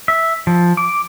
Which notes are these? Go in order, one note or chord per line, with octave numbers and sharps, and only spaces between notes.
E5
F3
D6